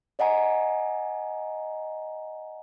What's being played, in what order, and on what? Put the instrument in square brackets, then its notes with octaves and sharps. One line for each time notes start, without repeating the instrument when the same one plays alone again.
[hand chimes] D5 D#5 F#5 G#5 A#5